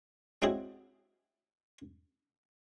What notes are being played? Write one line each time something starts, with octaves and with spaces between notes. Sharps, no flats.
G#3 C4 C#4 E4 F#4 G#4